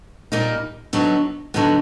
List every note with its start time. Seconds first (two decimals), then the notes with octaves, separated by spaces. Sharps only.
0.32 A#2 G3 A#3 D#4
0.93 D3 F#3 B3 D#4
1.54 D3 F#3 B3 D#4